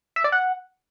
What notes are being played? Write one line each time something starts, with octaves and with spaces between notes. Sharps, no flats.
E5
D5
F#5